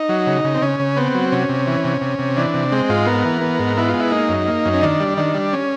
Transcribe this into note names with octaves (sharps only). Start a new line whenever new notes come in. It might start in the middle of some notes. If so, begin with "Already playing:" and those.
Already playing: D#4
F#3
C#3
C#3
C4
C#3 C#4
C#3
B3 C4
F#3
C3 C#4
C3
E3
C3
C3
C3
E3 D4
C3
G#3 C4
G#2 F4
B3 A#4
E3
B3
G#2
B3 E4
F4
G#3
E4
A#3 D#4
F#2
A#3
F#2
C#4
D#3 D4
G3
D#3 D4
G3
C#4